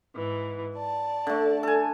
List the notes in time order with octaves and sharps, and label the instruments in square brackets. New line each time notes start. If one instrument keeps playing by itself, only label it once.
[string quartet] G#2 E3
D5 A5
[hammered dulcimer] D3 A3
A4 G#5